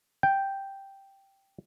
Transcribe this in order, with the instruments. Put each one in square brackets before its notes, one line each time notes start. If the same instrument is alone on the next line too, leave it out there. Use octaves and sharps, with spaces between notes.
[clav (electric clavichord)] G5